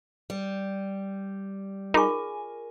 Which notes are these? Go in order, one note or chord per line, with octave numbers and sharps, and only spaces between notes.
G3
D#4 F4 G#4 A#4 G#5 C#6